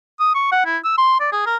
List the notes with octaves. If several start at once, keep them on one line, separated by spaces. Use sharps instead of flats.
D#6
C#6
F#5
E4
E6
C6
D5
G#4
A#4